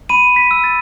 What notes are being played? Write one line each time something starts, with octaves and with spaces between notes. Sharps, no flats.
B5 D#7
B6
E6
A6